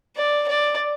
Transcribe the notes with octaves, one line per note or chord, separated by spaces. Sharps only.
D5
D5